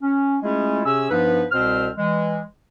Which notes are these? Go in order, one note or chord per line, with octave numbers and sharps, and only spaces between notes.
C#4
G#3 A3 C#4 E4 F4 G#4
C3 C#4 G#4 E6
G2 F3 B3 D#4 B4
C2 B2 C4 C5 F6
E3 G#3